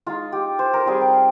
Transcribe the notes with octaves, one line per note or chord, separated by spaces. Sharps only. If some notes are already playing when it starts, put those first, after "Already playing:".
G#3 D#4 F4
G4
C5
A#4
G3 C4 F4 G#4
A#4